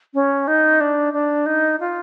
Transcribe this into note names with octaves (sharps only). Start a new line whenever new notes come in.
C#4
D#4
D4
D4
D#4
F4